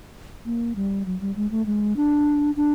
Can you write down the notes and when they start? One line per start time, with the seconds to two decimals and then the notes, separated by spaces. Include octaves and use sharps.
0.45 A#3
0.76 G3
1.06 F#3
1.21 G3
1.36 G#3
1.51 A3
1.66 G#3
1.97 D4
2.56 D4